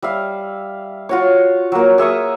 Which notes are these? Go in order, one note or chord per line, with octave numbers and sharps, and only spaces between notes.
G3 E5 F5
F4 F#4 C#5
F#3 A#3
G#4 E5 C#6 D#6